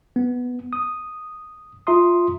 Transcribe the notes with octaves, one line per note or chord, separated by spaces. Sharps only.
B3
D#6
F4 E5 A#5 C6 D#6